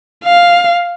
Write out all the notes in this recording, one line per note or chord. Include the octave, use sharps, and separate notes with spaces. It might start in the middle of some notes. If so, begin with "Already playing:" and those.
F5